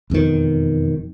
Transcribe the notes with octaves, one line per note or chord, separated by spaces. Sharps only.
E1 F2 B2 D#3